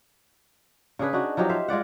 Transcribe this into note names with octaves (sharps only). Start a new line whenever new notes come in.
C#3 D4 G#4 B4
D4 D#4 F#4
F3 F#3 D#4 G4
C5 E5 F5
G#3 F4 D5 F#5